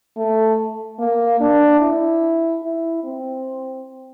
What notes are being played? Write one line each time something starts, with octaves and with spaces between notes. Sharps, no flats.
A3
A#3
D4
E4
E4
C4